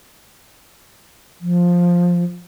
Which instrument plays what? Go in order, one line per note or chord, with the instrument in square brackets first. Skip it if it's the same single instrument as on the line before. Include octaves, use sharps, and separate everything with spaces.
[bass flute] F3